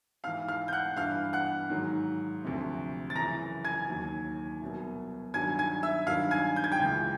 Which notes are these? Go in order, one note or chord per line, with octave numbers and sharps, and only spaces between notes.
G#2 E3 F5 F6
F5 F6
G6
F#5 F#6
G2 E3 F5 F6
F#5 F#6
G#2 D#3 F#3
D2 C3 F3
A6
F#2 C#3 E3 A#5 A#6
G#5 G#6
D#2 D#3 F#3
C2 B2 F#3
G2 D#3 F#3 G#5 G#6
G#5 G#6
E5 E6
G2 D#3 F#3 F5 F6
G#5 G#6
G6
G#6
G5 G6
C#2 C#3 E3